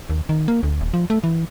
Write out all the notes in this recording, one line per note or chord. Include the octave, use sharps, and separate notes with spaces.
D#2
D#3
A#3
D2
D#1
F3
A3
E3